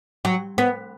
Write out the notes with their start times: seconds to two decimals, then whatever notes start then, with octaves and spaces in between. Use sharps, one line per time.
0.25 F#3
0.58 B3